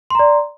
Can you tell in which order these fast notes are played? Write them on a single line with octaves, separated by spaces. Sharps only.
C6 A#5 D5